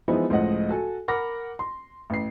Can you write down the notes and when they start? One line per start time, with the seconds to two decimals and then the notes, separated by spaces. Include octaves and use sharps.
0.08 E3 F3 G#3 B3 D#4 E4
0.30 C#2 A2 F3 D#5 F#5
0.69 F#4 A4 G#5
1.08 A#4 F#5 B5 D6 F6 A#6
1.59 C6
2.10 A1 C7